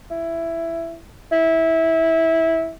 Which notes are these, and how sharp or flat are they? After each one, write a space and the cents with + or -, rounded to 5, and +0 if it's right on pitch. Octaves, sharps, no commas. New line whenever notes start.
E4 +10
E4 -15